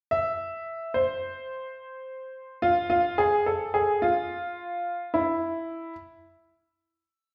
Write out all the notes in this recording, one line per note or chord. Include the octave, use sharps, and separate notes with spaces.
E5
C5
F4
F4
G#4
A4
G#4
F4
E4